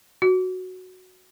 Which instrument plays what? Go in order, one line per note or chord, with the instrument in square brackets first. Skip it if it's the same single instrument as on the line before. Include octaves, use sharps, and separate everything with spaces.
[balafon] F#4